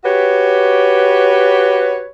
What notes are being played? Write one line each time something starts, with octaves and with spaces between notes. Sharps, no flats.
F#4 G4 B4 C#5